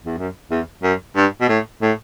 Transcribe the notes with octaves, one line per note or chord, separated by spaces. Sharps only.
E2
F#2
E2
F#2
G2
B2
A2
A2